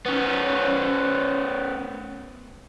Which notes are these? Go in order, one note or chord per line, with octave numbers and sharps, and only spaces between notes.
B3 C#4